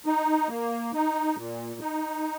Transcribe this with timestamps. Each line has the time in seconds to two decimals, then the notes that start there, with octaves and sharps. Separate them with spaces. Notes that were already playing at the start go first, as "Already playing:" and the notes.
0.06 D#4
0.49 A#3
0.93 D#4
1.36 A#2
1.80 D#4